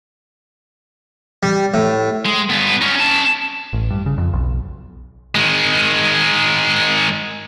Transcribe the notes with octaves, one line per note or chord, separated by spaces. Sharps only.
G3
A2
G#3
G2 B3
C#4 D#4
C#4 A5
A1
G2
C#3
F2
B1
D#3 G#3